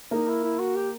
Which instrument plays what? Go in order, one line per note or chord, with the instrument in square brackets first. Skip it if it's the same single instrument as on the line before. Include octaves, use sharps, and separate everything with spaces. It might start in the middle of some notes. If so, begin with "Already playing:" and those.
[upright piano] A#3 A#4 [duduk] D#4
[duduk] E4
E4
F#4
G4